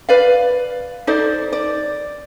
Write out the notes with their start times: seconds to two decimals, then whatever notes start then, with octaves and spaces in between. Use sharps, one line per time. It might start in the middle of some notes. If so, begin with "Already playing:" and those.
0.09 B4 D5 F5
1.07 D#4 A4 C5 D5
1.53 D5